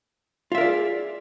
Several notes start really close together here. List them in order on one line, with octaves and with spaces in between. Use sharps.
F4 E5 A#4 D5 G#4